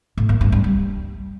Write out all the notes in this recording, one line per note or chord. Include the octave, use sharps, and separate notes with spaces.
A2
A#3
G2
G2
G3